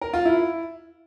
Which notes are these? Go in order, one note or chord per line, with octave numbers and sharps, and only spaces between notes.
A#4
F4
E4